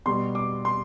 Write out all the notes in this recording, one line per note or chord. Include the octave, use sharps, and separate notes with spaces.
B2 G3 C6
D6
C6